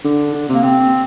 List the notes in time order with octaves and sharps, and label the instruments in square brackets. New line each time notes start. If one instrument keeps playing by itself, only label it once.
[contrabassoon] D3 [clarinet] D4
[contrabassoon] D3
C3
[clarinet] A#3
[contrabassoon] C3 [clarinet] C4